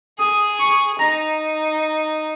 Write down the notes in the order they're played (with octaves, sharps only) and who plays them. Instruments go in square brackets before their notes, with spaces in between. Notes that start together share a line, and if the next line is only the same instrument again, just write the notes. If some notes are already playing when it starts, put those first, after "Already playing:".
[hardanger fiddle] G#4 [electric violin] D#6
[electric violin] C#6
[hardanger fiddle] D#4 [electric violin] A#5